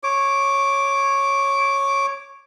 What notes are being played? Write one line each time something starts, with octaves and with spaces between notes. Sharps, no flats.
C#5 D6